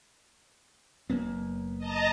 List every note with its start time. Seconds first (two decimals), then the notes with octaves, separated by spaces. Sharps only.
1.10 F#1 A#3 B3
1.78 D#5 A5 A#5